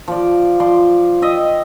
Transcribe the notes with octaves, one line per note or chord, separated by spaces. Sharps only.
F3 D5
F3 D5 C6
D#5 E5 G5